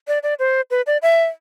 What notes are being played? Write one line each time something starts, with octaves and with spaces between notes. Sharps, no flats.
D5
D5
C5
B4
D5
E5